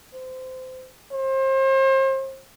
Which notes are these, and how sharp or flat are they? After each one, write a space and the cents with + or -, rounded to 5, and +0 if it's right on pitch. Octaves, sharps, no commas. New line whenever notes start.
C5 -25
C5 +35